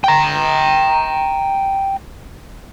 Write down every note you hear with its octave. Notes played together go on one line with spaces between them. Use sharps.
G5 A#5